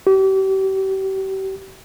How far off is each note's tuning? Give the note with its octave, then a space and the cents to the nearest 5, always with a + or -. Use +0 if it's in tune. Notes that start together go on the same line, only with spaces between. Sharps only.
G4 -35